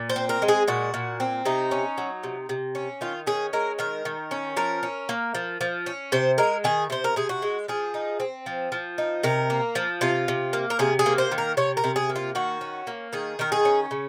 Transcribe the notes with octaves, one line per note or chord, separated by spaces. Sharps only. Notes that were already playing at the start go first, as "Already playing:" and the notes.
Already playing: A#2
C5
C4
A#4
G#3
G#4
A#2 F#4
A#2
C4
C3 D#4
C#4
F#3
C3
C3
C#4
D#3 F4
C#4 G#4
G#3 A#4
D#3 A#4
D#3
C#4
F3 A#4
C#4
A#3
F3
F3
C#4
C3 C5
G#3 A#4
D#3 G#4
C3 C5
A#4
C3 G#4
F#4
G#3
F3 G#4
D#4
C4
F3
F3
D#4
C3 A#4
A#3
F3
C3 F4
C3
A#3
A#4
C3 G#4
G#4
A#3
C5
D#3
A#4
C3 C#5
A#4
C3
G#4
A#3
F4
D#3 F#4
C#4
A#3
D#3 G#4
D#3 A#4
G#4
C#4
C#3